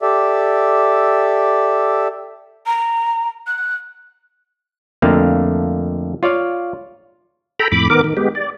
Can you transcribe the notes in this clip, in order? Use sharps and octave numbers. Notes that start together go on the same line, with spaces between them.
G4 A4 D5 E5
A#5
F#6
F2 D3 A3 A#3 F5
F4 C#5 D5 F5
A4 G5 A#5 B5
F2 A2 B5 D6
D#3 B3 A#4 D6
D#3
G#3 B3 G4
D5